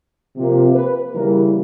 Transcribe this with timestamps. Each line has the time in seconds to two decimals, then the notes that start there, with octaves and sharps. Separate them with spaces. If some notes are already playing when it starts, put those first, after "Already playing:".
0.35 C3 F3 A#3
0.75 B4
1.14 C#3 E3 G3 A#3 A#4